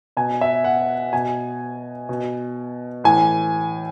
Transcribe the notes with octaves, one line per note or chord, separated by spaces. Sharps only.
B2 G#5
E5
F#5
B2 G#5
B2
A2 E3 G#5